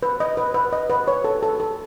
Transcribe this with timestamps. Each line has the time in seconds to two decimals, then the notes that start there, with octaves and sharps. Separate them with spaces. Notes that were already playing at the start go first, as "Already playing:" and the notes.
0.03 B4
0.20 D#5
0.37 B4
0.54 B4
0.73 D#5
0.90 B4
1.08 C#5
1.24 A4
1.43 A4
1.60 A4